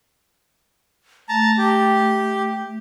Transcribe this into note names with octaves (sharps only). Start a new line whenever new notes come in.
A3 A5 A#5
G4